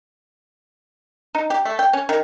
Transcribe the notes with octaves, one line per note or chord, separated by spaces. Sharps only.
D#4
G4
A3
G5
C#4
D#3